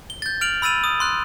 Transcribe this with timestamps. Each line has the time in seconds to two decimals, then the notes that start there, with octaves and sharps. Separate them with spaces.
0.10 G7
0.22 G6 A6
0.41 F6 D7 F7 F#7
0.62 B5 E6 A6 D#7 F7
0.84 D#6
1.00 C6 F#6